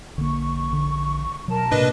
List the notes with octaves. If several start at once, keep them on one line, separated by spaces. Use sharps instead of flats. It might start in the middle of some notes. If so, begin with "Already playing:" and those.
A#1 D3 A#3 C#6
D3
B2 F#3 A#4 A5
A2 C3 A#3 D4 B4 D#5